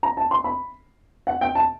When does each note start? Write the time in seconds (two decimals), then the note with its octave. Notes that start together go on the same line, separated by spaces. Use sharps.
0.03 A#5
0.17 A5
0.31 C6
0.44 B5
1.27 F#5
1.41 G5
1.55 A5